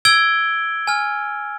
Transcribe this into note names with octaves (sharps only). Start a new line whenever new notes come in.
E6 G#6 D7 G7
G#5 F6